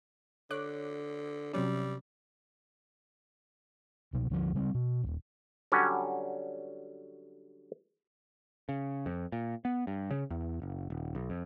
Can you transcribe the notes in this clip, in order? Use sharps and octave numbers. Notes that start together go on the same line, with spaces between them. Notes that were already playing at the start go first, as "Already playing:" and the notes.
D3 C#5 D6 F#6
C3 F#3 G3 C#4
C2 B2
D2 D3 E3 F3
C#3 G3 A#3 C4
B2
D#1 F2
D3 F#3 G3 C#4
C#3
F2
A#2
B3
G2
C#3
E2
F#1
D#1
B1
F2